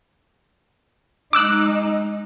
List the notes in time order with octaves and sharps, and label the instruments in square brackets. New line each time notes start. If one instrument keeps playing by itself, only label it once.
[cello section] G#3 D#4 [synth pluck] D6 E6 F#6